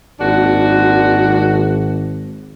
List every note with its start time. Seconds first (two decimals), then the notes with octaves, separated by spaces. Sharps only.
0.20 G#1 A#2 D4 F#4